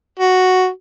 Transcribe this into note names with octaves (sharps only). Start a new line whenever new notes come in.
F#4